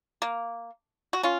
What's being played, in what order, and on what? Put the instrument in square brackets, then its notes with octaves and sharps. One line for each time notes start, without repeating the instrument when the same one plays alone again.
[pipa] A#3
F#4
C#4 F4